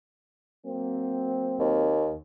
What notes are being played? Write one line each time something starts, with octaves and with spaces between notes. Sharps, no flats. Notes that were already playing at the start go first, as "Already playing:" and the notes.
F#3 A#3 C4
D#2